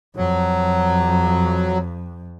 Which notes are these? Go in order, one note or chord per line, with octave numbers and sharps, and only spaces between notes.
F2 F#3